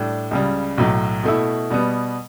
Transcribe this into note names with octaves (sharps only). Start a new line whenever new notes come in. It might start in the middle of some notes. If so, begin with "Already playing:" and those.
Already playing: A2 G3 D4 A4
C#2 C#3 G3
B1 A2 F#3
B2 A3 E4
B2 G3 B3